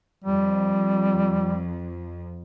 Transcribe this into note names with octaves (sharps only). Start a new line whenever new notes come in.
F2 G3